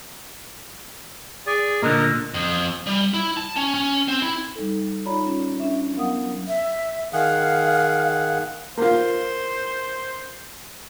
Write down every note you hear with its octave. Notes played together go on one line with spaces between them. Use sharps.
G#4 D5 G#5
A#2 D3 A#4 D#5 A#5
F2
G3
E4
A5
C#4
C#4
C4
E4
G3 D#4 A4
D#4 F4 C#5 D5 A#5 B5
C#4 F4
C#4 D4 E5
F#3 B3 A#4 F5 F#5 D#6
E5
D#3 G#4 F5 F#5
A#3 F4 C5